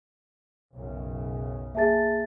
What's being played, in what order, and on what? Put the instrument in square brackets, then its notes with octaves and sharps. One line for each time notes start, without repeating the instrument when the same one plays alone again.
[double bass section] B1 F#2 C#3
[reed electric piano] A#3 G#4 [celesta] E5 A5 A6